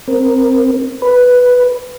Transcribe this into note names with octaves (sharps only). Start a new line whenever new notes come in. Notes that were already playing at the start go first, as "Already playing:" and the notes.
C4 A#4
B4